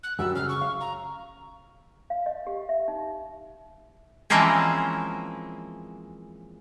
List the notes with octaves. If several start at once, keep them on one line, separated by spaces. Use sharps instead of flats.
F#6
F#2 F#3 G3 E6
C#3 F6
C#6
F5
A#5
F5
D#5
G4
E5
D#4
E3 F3 G#3 A#3 C4 C#4